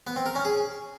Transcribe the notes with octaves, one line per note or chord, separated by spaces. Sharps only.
B3
C4
A#4
C#4
G#4